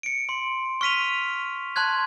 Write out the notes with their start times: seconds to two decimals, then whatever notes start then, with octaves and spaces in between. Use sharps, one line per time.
0.03 C#7 D7
0.29 C6
0.81 C#6 F6 B6 D#7 F7
1.76 A5 C6 F#6 G#6